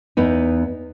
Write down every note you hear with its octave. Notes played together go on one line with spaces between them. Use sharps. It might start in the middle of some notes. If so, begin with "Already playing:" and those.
E2 B3 D#4